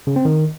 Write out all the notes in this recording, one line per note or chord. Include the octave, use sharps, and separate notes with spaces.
C#3
C4
D#3